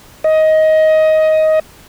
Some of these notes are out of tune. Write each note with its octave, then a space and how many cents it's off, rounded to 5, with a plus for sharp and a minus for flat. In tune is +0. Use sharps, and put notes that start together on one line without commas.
D#5 +15